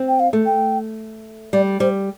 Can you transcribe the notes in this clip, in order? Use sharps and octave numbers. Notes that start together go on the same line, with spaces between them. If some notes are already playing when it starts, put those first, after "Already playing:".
Already playing: C4
G5
F5
A3
G5
G3 D5
G3 C5